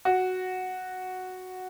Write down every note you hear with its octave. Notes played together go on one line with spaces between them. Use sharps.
F#4